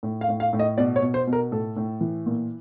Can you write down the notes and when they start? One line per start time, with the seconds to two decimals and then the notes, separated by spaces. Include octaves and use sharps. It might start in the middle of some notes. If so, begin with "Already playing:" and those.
0.03 A2
0.21 F5
0.29 A2
0.40 F5
0.53 A2
0.59 D#5
0.78 B2 D5
0.96 C#5
1.02 B2
1.14 C5
1.27 B2
1.33 A#4
1.51 A2 A4
1.76 A2
2.01 E3
2.26 A#2